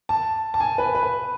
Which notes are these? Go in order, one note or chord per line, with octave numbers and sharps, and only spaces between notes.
A5
A5
G#5
B4
B4